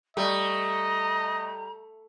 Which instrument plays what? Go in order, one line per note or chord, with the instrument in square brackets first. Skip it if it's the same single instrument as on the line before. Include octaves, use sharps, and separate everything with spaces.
[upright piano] G3 [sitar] A3 [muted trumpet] D#5 [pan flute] A#5